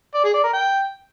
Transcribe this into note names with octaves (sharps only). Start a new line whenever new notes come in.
D5
G#4
D5
A#4
G5